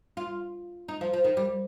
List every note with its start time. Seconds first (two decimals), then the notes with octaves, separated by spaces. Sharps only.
0.17 F4
0.88 D#4
1.01 F3
1.13 F3
1.24 D#3
1.37 G3